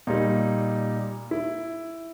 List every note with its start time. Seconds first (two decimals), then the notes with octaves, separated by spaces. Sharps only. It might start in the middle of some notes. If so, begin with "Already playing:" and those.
0.07 A#2 G3 D#4
1.31 E4